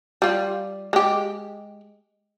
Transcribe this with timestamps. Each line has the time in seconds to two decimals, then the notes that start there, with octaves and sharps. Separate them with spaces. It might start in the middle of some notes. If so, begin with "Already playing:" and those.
0.22 G3 F4
0.93 G#3 G4